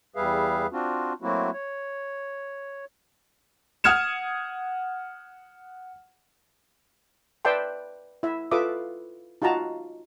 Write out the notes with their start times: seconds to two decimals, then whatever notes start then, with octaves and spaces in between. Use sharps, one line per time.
0.16 E2 G3 G#4 B4 E5 F5
0.72 C4 D4 F4 F#4
1.22 F#3 A3 A#3 C4 E4 F#4
1.53 C#5
3.84 F#5 D#6 F6 G#6 C#7 E7
7.45 B4 D5 E5 G5 A5 C6
8.23 E4 E5
8.51 F4 A4 B4 E5 D6 D#6
9.42 D#4 F4 F#4 A5 A#5